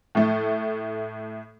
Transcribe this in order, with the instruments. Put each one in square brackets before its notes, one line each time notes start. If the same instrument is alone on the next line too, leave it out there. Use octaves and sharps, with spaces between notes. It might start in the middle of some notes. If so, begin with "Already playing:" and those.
[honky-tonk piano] A2 A3